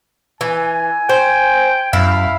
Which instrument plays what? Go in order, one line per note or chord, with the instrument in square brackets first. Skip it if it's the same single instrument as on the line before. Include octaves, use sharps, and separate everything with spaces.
[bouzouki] E3 [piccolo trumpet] G#5
[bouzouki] C5 [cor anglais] G5
[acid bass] F#2 [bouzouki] E4 [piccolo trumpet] F5